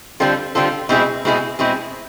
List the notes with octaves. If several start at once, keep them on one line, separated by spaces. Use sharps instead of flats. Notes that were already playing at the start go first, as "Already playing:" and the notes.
D3 G3 C4 F4 A4
D3 G3 C4 F4 A4
B2 G#3 C4 E4 G#4
B2 G#3 C4 E4 G#4
B2 G#3 C4 E4 G#4